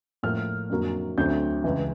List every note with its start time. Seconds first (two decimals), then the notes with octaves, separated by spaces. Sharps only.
0.23 A2 F3 A#3 F6
0.69 F2 D3 F#3 A#3
1.18 D2 D3 F#3 A3 C4 G6
1.64 C#2 C#3 E3